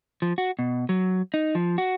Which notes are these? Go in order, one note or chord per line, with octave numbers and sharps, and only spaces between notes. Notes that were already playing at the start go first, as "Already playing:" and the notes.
F3
F#4
B2
F#3
D#4
F3
F#4